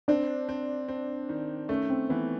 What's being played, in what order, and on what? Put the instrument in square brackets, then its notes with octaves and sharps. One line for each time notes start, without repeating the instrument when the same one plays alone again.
[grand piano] C4 [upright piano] D4
[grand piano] C4
C4
D#3
[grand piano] A3 [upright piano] C#4
[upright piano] C4
[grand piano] E3 [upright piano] B3